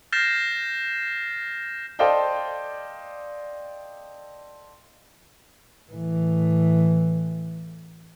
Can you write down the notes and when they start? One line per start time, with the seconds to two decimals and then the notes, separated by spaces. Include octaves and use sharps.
0.12 F6 G6 A6 A#6 C7 E7
1.99 A4 C5 D5 D#5 F5 G5
5.90 A2 E3